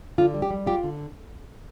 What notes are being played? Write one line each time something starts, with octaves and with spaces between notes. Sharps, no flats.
D3 F4
G3
G4
G3
F4 G4
D3